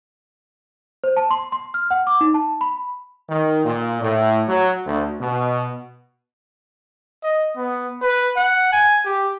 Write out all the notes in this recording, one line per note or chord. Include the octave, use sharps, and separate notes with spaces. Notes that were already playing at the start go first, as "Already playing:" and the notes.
C5
A5
C6
C6
F6
F#5
D6
D#4
A5
B5
D#3
A#2
A2
F#3
D2
B2
D#5
B3
B4
F#5
G#5
G4